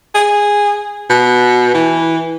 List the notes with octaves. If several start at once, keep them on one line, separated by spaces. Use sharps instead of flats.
G#4
B2
E3